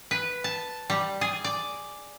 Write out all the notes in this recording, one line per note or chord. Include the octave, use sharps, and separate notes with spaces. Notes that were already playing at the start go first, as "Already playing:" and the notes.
B4
A5
G3
G#4
D5